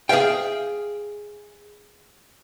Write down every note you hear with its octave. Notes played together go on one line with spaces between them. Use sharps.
G#4 A#4 E5 F5 G5